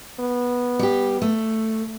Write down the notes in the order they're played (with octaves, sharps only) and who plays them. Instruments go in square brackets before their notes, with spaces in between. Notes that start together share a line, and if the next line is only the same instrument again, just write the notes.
[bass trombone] B3
[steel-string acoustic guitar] G3 G4
A3